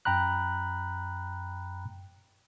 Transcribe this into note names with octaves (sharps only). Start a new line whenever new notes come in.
F#2 G5 A#5 B5 F#6